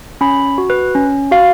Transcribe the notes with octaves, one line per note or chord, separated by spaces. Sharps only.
C#4 B5
F#4
B4
C#4
F#4 F5